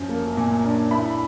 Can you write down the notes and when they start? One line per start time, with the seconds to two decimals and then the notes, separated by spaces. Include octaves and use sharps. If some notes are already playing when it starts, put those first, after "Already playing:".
Already playing: F#2 F3
0.09 A#3
0.37 A#2
0.64 D4
0.91 E4 B5